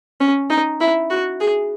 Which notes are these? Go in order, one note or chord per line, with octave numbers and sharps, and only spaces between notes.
C#4
D#4
E4
F#4
G#4